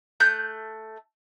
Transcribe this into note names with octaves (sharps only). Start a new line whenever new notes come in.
A3 F#6 G6